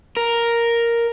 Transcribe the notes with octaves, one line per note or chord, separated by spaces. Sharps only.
A#4